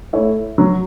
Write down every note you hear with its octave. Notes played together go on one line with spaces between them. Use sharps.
A3 E4 C#5
F#3